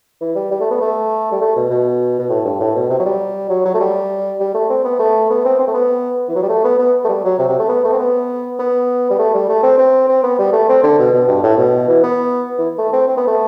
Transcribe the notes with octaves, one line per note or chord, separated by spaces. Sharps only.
E3
G3
G3
A3
B3
A3
G3
A3
B2
B2
B2
A2
G2
A2
B2
C3
F#3
G3
F#3
F#3
A3
G3
G3
A3
C4
B3
A3
B3
C4
C4
A3
B3
E3
F#3
G3
A3
B3
B3
A3
G3
F#3
C3
C3
A3
B3
A3
C4
B3
B3
G3
A3
G3
A3
C4
C4
C4
B3
G3
A3
C4
D3
B2
B2
G2
A2
B2
E3
B3
E3
A3
C4
C4
B3
A3